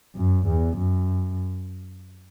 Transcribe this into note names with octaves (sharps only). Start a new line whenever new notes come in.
F#2
E2
F#2